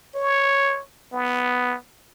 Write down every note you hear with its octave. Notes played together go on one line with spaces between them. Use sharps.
C#5
B3